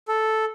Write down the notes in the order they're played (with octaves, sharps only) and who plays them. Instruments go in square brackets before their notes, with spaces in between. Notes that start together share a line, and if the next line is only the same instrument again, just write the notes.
[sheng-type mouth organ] A4